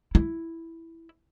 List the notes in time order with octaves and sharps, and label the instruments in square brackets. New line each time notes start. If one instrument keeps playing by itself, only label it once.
[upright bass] E4